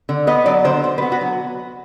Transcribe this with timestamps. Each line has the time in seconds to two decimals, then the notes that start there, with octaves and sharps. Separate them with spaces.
0.09 D3
0.27 B3 D#5
0.46 F#3 D5
0.65 D3 C5
0.84 D3 C5
0.98 B4
1.02 B3
1.12 F#4
1.21 F#3